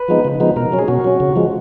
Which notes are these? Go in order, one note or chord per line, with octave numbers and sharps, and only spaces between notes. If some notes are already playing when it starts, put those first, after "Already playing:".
Already playing: B4
F3 G#3 B3 D#4
C#3
F3 G#3 B3 D#4
B2 A#4
F#3 C#4
G#4
B2 F#4
F#3 C#4
C#3
F3 G#3